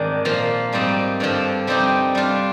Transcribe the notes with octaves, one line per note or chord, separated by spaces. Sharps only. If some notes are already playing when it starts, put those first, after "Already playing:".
Already playing: G#2 D#3 G#3 C4 D4
A#2 F3 A#3
G#2 G3 C4 D#4
G2 D3 F3 C4
C3 G3 C4 D#4 G4
G3 D4 F4